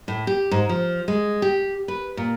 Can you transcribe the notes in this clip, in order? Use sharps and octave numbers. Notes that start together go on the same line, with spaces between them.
A2
G4
G#2
F3
G#3
G4
B4
A#2